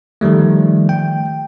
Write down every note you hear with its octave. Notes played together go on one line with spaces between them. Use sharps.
D#3 F3 G3 A3
G5